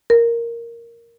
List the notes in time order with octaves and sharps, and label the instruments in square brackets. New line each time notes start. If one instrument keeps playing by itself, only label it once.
[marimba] A#4